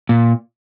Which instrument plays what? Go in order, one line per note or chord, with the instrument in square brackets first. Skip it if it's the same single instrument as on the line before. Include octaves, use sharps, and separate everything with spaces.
[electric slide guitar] A#2